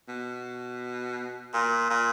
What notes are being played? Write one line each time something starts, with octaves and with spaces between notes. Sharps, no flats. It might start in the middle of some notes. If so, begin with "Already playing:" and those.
B2
A#2
A#2